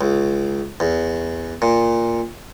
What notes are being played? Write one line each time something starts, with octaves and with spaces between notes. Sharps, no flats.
C#2
E2
A#2